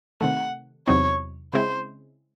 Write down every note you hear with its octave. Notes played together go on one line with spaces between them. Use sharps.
C3 D#3 A3 F#5
E2 C3 F#3 C4 D#4 C#5
C#3 G#3 C4 E4 C5